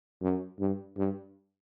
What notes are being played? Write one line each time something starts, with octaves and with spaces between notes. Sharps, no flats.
F#2
G2
G2